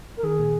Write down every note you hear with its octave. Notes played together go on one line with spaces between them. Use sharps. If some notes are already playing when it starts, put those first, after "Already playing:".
A#4
D#3 G#4
A#2